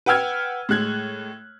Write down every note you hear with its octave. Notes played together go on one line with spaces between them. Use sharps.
B4 F#5 G5 E6 F6 G#6
A2 G#3 F#6 G#6